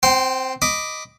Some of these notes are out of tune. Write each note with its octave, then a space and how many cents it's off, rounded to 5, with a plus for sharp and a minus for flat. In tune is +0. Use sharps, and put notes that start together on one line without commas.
C4 +0 G5 -45 C6 +0
D#5 +0 B5 +15 D6 +0